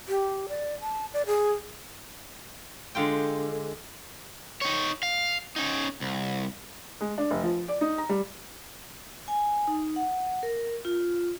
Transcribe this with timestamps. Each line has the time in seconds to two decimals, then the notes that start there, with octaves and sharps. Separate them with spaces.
0.08 G4
0.49 D5
0.80 A5
1.13 D5
1.26 G#4
2.95 D3 G#3 F4 G5
4.61 D#4 C#5
5.03 F5
5.56 C#4 D#4
6.01 C2
7.01 G#3
7.18 D4
7.31 F1
7.43 F3
7.68 D5
7.81 D#4
7.98 A#5
8.09 G3
9.28 G#5
9.68 D#4
9.96 F#5
10.43 A#4
10.85 F4